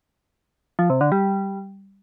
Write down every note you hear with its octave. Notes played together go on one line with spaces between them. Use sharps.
F3
C3
D3
G3